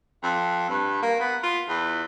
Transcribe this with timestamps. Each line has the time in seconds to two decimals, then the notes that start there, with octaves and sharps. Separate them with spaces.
0.23 F2
0.70 G2
1.02 A#3
1.20 B3
1.43 F4
1.68 E2